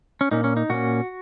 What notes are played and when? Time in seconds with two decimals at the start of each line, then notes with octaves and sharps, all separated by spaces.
0.21 C#4
0.31 A#2 A#3 C#4 D#4
0.44 C#4
0.57 D#4
0.69 A#2 A#3 C#4 F#4